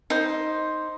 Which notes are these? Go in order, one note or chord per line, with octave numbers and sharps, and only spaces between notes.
D#4 C5